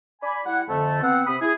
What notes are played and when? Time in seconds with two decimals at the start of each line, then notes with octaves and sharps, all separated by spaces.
0.22 D5 G#5 B5
0.45 G3 E4 F#5
0.68 F2 D3 A3 A5
1.02 B3 C4 F#5
1.27 C3 B5 D#6
1.42 E4 G#4